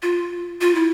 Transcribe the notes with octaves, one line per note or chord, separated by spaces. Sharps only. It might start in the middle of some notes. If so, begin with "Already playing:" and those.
F4
F4
E4